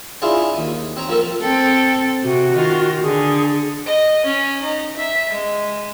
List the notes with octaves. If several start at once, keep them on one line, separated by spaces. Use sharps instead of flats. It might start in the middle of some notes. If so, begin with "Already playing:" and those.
D4 E4 F4 G#4 C#5
D#2 D#6
C4 C#5 A#5
F3 A#3 C4 A4 A#4
C4 A4 G5
C3 F#4
D#3 F4
D3 G#4
D#5
C#4
D#4
E5
G#3